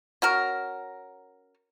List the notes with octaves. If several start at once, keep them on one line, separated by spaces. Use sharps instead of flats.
C#4 F#4 A#4